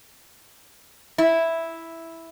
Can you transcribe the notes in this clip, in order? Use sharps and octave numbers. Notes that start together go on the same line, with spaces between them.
E4